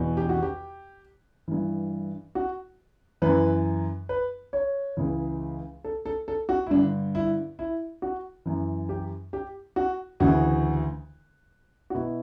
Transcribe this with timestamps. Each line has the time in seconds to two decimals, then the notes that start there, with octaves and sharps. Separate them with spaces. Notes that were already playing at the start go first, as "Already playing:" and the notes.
Already playing: E2 B2
0.17 G4
0.29 F#4
0.43 G4
1.48 G2 E3
2.35 F#4
3.22 F#2 E3 B4
4.09 B4
4.53 C#5
4.97 C#2 C#3 E3
5.84 A4
6.06 A4
6.28 A4
6.49 F#4
6.67 E4
6.71 G2 D3 D4
7.15 E4
7.59 E4
8.02 F#4
8.46 F#2 E3
8.89 G4
9.33 G4
9.76 F#4
10.20 D2 C#3 E3 F#4
11.90 F#4
11.95 B2 E4